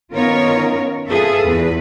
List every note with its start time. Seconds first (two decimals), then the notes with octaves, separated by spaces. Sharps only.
0.13 D#3 B3 C#4 F4 A#4 C#5
1.09 F4 G#4 A4 B4 E5
1.43 E2 B4